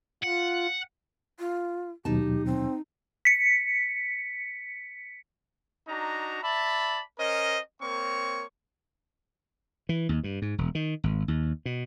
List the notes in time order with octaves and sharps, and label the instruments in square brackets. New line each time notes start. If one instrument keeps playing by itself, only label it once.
[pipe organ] F4 [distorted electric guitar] F#5
[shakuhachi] F4
[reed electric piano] D#2 B2 F#3 [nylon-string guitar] D#4 A5 [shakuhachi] G4
[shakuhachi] C4
[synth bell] B6 C#7
[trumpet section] D4 D#4 F#4 A#5
D5 E5 A5 B5
C#4 A#4 C5 D#5
A#3 C4 A#4 C#5 C#6
[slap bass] E3
D#2
G2
G#2
E1
D#3
G#1
D#2
B2